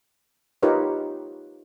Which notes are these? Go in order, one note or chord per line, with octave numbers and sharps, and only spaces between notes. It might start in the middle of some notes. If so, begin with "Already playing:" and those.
D#4 F4 G4 A#4 B4 C#5